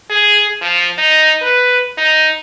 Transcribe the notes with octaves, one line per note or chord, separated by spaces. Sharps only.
G#4
F3
D#4
B4
D#4